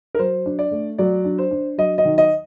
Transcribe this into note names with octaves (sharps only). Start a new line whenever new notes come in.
A#4
F#3 C5
D4
D5
A3
F#3 D5
D4
C5
D4
F#3 D#5
D#5
D#3
D#5